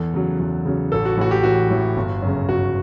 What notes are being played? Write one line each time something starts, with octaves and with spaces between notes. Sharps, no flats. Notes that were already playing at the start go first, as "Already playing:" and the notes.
Already playing: E2 A4
C#3 F#3
E2
C#3 F#3
A1 A4
F#4
A2 E3 F#4
G4
A1 F#4
A2 E3
G1
F#2 C#3
G1 F#4